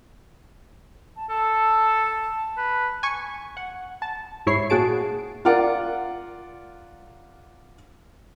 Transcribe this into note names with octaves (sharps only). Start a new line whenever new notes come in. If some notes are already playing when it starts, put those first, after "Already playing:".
A5
A4 A5
B4
G#5 C#6
F#5
A5
G#2 E4 C#5 C#6 C7
A#2 F#4 G#4 A5 D7
F4 A#4 D5 F#5